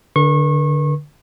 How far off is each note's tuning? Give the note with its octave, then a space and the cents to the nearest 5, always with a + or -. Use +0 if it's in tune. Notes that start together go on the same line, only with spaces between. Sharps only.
D3 +0 B4 -45 C#6 -30